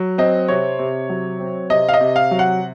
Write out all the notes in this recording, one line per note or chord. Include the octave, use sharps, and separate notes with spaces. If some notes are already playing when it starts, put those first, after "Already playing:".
Already playing: F#3
C4 D#5
C3 C#5
C3
F#3
C4
C3 D#5
F5
D#5
C3
F5
F#3
F#5